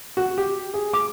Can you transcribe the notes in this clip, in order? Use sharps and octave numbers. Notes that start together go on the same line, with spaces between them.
F#4
G4
G#4
D6